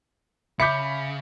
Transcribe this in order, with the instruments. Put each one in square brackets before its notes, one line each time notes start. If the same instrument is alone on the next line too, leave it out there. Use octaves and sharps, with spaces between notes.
[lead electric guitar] C#3 [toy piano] E5 D6 [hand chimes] B5 [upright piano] G6 B6 C#7